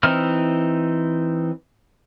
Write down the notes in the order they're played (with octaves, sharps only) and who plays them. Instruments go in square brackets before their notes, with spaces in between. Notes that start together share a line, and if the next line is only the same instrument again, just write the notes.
[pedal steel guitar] E3 C4 D#4 E4 F6